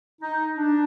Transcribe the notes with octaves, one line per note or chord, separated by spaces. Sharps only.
D#4
D4